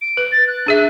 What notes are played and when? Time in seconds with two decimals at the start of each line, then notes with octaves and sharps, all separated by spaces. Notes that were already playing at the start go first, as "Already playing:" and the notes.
0.01 D7
0.17 B4
0.32 A6
0.47 F#6
0.66 D4 G#4 E5